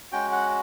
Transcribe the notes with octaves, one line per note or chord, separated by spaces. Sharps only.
G#3 C#4 F#4 G5
F#5